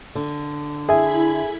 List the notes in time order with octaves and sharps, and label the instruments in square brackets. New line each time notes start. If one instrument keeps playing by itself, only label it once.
[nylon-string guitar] D3
[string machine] E4 B5 G#6 [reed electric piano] G#4 G#5 [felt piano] E5